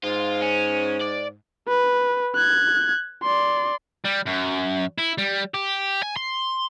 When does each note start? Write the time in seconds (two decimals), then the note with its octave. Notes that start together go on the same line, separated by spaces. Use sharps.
0.04 G#2 F4
0.42 C#4
1.01 D5
1.68 B4
2.35 F#6 G#6
3.23 D5 C6
4.05 G3
4.26 F#2
4.98 E4
5.18 G3
5.54 G4
6.03 G#5
6.17 C6